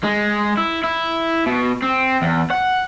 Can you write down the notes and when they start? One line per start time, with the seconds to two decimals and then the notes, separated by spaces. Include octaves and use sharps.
0.04 G#3
0.58 E4
0.84 E4
1.46 B2
1.83 C4
2.22 E2
2.50 F#5